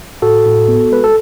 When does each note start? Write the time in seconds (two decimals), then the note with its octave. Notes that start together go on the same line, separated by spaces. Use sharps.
0.22 A2 F#4 A4
0.45 A2
0.68 B3
0.92 G#3 B4
1.04 A4